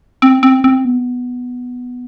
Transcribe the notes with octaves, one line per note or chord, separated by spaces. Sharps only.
C4
C4
C4
B3